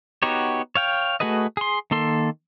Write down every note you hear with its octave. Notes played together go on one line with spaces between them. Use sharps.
B3 D#4 F#4 G4 C#5
C#5 F5 G5
A3 F#4 G#4 B4 D#5
G#4 C6
D#3 A#3 A4 C6